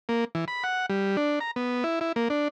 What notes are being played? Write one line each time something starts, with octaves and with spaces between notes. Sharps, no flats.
A#3
E3
B5
F#5
G3
D4
A#5
B3
E4
E4
A#3
D4